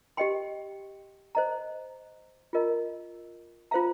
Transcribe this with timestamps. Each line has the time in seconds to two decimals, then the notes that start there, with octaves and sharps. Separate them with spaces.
0.17 G4 D#5 G5 C6
1.35 C5 D#5 A#5
2.53 F4 A#4 D#5 A#5
3.71 F4 C5 F5 A#5